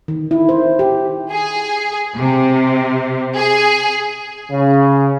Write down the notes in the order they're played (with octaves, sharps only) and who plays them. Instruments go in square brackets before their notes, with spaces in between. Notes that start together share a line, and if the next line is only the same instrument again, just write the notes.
[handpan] D#3
E4
C5
G4
[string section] G#4
C3
G#4
[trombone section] C#3